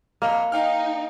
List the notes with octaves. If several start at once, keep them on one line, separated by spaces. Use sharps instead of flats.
F2 A#3 D#5 F6
D#4 F5 G5 F6